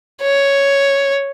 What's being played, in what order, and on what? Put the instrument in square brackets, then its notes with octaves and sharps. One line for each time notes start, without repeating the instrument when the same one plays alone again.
[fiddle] C#5